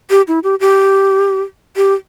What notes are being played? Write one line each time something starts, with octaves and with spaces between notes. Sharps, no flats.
G4
E4
G4
G4
G4